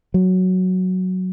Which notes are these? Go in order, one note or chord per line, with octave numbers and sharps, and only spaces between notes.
F#3